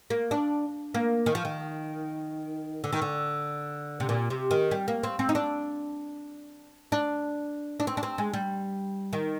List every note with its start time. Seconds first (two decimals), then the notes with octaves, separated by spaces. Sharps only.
0.10 A#3
0.31 D4
0.94 A#3
1.26 D#3
1.35 F3
1.45 D#3
2.84 D3
2.93 D#3
3.02 D3
4.00 C3
4.09 A#2
4.30 C3
4.51 D#3
4.71 G3
4.88 A#3
5.03 C4
5.19 C4
5.29 D#4
5.35 D4
6.92 D4
7.80 D4
7.87 C4
7.97 D4
8.03 C4
8.18 G#3
8.34 G3
9.13 D#3